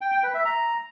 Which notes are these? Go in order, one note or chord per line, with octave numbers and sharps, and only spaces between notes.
G5
G5
B4
E5
A#5